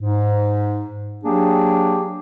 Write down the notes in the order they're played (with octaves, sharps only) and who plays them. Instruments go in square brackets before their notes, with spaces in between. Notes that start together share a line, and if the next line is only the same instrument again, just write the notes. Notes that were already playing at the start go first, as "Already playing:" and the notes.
[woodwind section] G#2
F#3 A#3 D4 G4 G#4